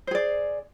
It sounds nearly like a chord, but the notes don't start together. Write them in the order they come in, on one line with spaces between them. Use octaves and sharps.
C5 G#4 D5